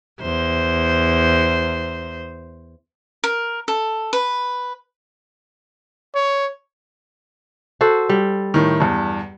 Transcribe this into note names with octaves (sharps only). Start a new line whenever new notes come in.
E2 C5
A#4
A4
B4
C#5
F#4 A4 C5
G3
A2 D#3
E2 G2